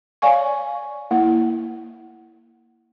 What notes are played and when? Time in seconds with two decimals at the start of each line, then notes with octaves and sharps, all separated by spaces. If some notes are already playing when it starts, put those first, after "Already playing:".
0.22 C#5 D5 F5 G#5 C#6
1.11 A#3 E4